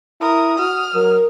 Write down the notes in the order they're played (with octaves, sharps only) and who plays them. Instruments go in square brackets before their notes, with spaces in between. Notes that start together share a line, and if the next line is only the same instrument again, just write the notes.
[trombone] E4 [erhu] A#4 [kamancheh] D#6
[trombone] F#4 [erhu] F6
[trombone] F#3 [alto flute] A#4